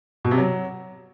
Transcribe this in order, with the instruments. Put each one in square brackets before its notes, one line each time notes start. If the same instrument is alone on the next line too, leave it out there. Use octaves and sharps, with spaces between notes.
[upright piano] B2
C3
F#3